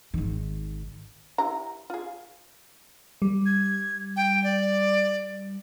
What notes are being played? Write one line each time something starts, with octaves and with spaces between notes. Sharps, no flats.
G#1 D#3
E4 G4 A#5
F4 G#4
G3
G#6
G5
D5